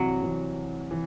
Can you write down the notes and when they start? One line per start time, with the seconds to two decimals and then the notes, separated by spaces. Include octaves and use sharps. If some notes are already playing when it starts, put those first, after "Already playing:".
Already playing: C2 C3 E3 F#3
0.21 C2 C3 E3
0.91 E3